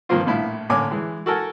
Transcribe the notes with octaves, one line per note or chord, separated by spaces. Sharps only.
G2 D#3 F3 A#3 C4 F4
A#1 A2 E4 F5
A1 D3 A#3 C#5 G#5 D6
E3 G#3
F#4 A4 A#4 G#5 A5